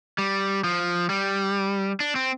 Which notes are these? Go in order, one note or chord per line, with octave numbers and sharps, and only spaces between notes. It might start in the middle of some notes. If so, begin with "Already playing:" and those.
G3
F3
G3
D4
C4